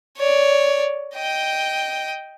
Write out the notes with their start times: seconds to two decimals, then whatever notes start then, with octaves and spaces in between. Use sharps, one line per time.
0.17 C#5 D5
1.15 D#5 G5